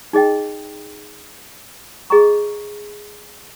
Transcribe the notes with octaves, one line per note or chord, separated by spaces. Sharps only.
D#4 G#4 D#5 G5
G#4 D#5 A#5 C#6